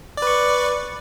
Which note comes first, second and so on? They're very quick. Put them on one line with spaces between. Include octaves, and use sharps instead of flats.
D5 B4 C#6